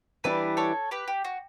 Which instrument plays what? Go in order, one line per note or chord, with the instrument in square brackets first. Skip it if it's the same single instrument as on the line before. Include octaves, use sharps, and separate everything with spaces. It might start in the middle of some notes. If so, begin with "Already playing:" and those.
[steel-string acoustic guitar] E3 G3 D4 [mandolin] B4 D5
[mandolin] A4 C#5
G4 B4
G4
F#4